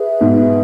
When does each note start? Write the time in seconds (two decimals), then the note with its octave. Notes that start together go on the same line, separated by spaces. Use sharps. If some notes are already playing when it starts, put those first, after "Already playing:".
Already playing: G#4 B4 E5
0.21 G#2 B2